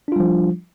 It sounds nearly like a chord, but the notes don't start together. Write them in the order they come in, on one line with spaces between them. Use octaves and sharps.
D4 F4 G3 F3